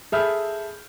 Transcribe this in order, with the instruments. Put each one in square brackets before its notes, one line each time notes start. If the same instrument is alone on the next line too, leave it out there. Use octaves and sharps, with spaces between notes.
[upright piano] G#4 A4 E5 B5 F6 G6